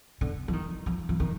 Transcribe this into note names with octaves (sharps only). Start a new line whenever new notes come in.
D3
F3
D#3
F3
F3
D#3